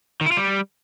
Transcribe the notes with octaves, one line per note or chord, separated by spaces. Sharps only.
D#3
E4
F4
G3